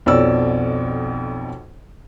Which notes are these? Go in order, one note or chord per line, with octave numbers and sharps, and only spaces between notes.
B1 F2 B2 C#5 D5 E6